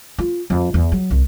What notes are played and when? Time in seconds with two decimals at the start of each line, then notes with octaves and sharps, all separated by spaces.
0.18 F4
0.50 F2
0.74 E2
0.92 F#3
1.11 C2